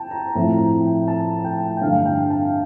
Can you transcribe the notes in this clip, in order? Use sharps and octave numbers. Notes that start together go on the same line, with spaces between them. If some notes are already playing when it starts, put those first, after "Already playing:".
Already playing: G5 A5
A#5
A2 F3 C4 A#5
A5
G5
G5
G2 D3 A3 D4 F5
G5
A5